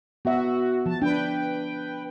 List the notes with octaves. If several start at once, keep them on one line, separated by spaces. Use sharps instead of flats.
B3 F#4 E5
F3 A5
D4 B4 G5